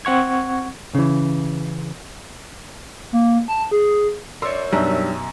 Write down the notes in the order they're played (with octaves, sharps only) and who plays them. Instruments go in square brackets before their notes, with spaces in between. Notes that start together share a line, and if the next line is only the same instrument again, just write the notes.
[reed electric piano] C4 F#5 C#6 G#6
[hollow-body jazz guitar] C#3 E3
[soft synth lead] A#3
A5
G#4
[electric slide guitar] A#4 C#5 [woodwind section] D5 [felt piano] C6 E6
[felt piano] F#2 B2 A#5 [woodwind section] F#3 D#4 E5 [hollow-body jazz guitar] G3 D4